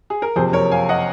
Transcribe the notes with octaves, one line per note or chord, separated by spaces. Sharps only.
G#4
A#4
F#1 F2 C3 G#4 C5
A#4 C#5
F5 G#5
D#5 F#5